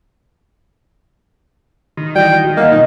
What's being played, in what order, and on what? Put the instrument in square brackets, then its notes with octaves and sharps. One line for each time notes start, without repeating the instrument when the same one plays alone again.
[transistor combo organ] D#3 [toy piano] F#4
[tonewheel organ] E3 G3 F#4 [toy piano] D5 [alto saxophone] G5
[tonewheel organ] G3 [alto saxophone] A#3 [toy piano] D#5 F#5 G#5
[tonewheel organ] B2 F3 G3 [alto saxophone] D#4